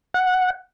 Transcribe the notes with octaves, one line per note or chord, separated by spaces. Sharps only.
F#5